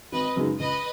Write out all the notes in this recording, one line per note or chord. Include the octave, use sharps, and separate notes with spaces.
G#1 B4 D#5
F#2 C#3 G#3 D#4
C#2 B4 D#5